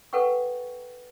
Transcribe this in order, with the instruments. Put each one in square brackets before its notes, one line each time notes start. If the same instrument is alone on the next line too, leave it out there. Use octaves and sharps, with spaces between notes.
[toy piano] A4 B4 F#5 G5 C#6